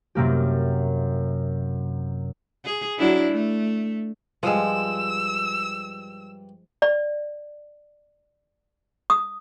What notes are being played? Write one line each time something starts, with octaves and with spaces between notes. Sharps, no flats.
F#2 C3 A#3 G4
G#4
F#3 D4 E4
A3
G2 F3 G#3 E6
D5
D#6